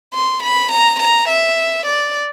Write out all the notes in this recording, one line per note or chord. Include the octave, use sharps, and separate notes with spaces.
C6
B5
A#5
A#5
E5
D5